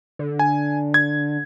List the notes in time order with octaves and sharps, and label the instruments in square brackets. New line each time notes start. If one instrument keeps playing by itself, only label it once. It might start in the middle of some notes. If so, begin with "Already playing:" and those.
[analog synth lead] D3
[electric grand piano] G#5
G#6